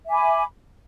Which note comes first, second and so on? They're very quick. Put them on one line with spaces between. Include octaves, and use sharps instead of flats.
E5 G#5 D6 B5